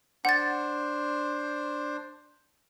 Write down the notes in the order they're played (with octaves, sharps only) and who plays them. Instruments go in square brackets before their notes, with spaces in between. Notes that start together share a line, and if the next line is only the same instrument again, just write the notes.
[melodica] D4 C5 [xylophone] F#5 A6